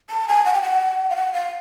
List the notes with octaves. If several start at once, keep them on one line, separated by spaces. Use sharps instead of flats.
A5
G#5
F#5
G5
F#5
F5
F#5
F5